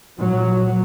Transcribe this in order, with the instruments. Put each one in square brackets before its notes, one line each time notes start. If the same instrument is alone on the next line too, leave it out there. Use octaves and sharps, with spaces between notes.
[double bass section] A#2 F#3